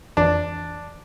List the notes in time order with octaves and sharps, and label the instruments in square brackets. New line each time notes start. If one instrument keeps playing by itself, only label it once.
[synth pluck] G#1 F2 E3 [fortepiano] D4